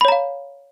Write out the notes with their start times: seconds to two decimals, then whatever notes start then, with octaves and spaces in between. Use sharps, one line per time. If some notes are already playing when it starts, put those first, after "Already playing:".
0.01 B5
0.05 C#5
0.08 A#5
0.12 F5